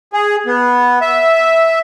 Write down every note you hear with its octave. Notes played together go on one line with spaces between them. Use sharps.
G#4
B3
E5